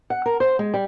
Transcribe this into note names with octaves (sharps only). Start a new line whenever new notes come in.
F#5
A#4
C5
G#3
G3